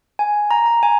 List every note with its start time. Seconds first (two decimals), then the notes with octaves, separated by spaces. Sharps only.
0.19 G#5
0.51 A#5
0.66 A#5
0.83 G#5